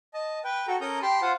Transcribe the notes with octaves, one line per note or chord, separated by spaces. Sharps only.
D#5 A5
B4 G5
F#4 A4 G5 A#5
C#4 A4 A#4 A#5 D#6 G6
G4 G5 A5 B5 C6
F4 C5 F5 F#5